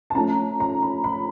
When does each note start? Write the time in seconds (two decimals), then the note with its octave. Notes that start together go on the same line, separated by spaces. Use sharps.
0.10 A5
0.15 F3 A3 C#4 A#5
0.60 A#5
0.82 B5
1.04 B5